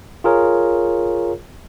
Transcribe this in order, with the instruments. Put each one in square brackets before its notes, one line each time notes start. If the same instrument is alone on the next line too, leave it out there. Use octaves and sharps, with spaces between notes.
[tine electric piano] F4 G#4 A#4 C#5